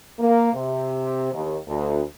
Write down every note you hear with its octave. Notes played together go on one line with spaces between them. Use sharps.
A#3
C3
D#2
D2